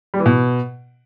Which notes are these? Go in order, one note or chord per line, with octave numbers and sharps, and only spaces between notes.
G3
E3
B2